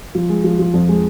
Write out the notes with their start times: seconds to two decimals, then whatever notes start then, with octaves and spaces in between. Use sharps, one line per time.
0.15 F3
0.29 G#3
0.44 F3
0.59 F3
0.74 F2
0.89 G#3